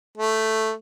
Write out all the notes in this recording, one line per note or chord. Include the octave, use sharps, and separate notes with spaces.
A3